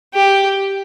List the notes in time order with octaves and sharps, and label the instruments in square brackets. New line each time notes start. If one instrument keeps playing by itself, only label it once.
[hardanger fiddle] G4